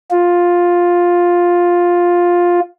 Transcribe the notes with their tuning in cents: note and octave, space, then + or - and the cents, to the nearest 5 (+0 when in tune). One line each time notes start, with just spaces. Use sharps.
F4 +10